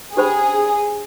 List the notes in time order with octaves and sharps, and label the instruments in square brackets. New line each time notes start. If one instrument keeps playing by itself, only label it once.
[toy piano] D4 G4 C5 G5 B5 [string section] G#4